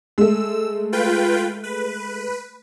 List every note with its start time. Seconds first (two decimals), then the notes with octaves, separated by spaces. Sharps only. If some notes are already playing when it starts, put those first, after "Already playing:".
0.18 G#3 A3 E6
0.92 F4 B4 G5
1.63 B4